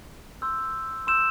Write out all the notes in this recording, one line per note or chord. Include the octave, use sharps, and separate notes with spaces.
C6 E6 G6
C6 E6 G6 E7